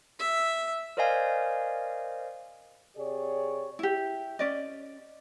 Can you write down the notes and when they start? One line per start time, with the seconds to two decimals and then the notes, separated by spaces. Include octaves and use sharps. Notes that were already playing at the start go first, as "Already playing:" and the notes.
0.19 E5
0.97 A#4 C5 D5 D#5 F5 G#5
2.96 C3 G4 G#4 C#5 D5
3.79 E4 G4
4.39 C#4 D5 D#5